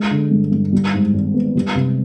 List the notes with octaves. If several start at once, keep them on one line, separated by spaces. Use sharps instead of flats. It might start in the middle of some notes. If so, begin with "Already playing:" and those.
Already playing: G#3
D3
G2
G2
G3
G#2
G#1
B3
G3
C3